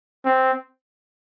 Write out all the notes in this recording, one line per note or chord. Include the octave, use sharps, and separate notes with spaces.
C4